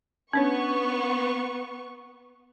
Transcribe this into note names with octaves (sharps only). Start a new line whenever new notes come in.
B3 C#4 D4 C#5 C#6